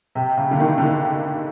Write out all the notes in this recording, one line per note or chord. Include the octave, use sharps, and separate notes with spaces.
C3
C#3
D3
D#3
D3
D#3